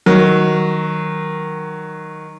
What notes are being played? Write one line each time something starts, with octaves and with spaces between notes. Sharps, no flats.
D#3 F#3